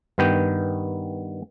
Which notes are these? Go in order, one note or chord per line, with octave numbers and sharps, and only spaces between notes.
G2 D#3 B3 G5